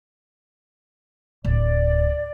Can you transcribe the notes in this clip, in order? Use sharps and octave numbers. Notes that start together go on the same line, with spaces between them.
D1 D5